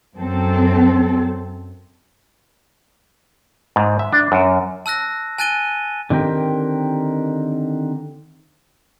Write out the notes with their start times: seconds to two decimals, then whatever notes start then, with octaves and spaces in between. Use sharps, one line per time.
0.16 F#2 C4 A4
3.76 G#2
3.99 E5
4.13 D4
4.32 F#2
4.86 A5 E6 F#6 A#6
5.38 G#5 A5 F#6 A6 D#7 G7
6.10 D3 D#3 C4 G4 A#4